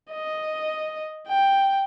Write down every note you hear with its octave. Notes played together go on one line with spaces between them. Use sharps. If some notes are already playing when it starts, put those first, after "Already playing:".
D#5
G5